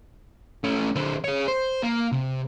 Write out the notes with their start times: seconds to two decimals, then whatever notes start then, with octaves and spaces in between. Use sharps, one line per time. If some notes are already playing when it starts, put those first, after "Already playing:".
0.64 A3 C#4
0.96 D3 C4
1.24 G#4 C#5
1.48 C5
1.82 A#3
2.12 C3